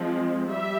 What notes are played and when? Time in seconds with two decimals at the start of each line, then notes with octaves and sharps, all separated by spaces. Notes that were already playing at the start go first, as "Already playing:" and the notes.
Already playing: F3 G#3 C4
0.49 G3 E5